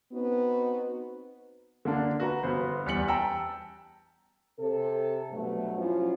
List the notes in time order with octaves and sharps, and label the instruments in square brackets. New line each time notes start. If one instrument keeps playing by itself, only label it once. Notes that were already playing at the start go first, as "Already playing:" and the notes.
[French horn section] B3 C4 D#4 F#4 B4
[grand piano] D3 A#3 D4
F#4 B4 A#5
G1 B3 C5
E2 G3 B6 C#7 F#7
G5 A5 A#5 E6
[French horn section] C3 A4
G2 B2 F#3 A3
F3 F#3 C#4 E4 F4